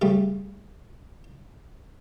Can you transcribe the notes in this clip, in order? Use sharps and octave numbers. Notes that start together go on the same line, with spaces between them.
C#3 G3 A3